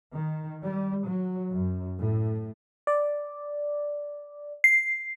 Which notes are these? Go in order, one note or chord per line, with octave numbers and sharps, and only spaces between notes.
D#3
G3
F#3
F#2
A2
D5
C7